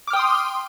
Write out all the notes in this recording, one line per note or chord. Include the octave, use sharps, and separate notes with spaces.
G5 C6 D6 D#6 F6